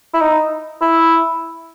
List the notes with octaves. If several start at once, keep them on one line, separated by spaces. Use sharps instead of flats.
E4
D#4
E4